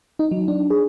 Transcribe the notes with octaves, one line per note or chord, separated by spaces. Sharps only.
D#4
F#3
D4
G#4